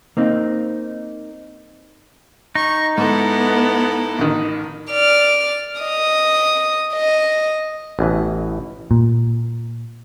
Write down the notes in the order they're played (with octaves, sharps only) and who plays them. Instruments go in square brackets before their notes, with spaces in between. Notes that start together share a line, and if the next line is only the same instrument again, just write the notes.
[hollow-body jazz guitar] A#3 C4 D#4
[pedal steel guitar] D#4 [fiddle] C#6
[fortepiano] G#2 [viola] B3 [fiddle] E4 A4
[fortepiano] A1 D#3
[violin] D5 F6
D#5 D#6
D#5
[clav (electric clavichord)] A1 B2 E3 B4
[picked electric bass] A#2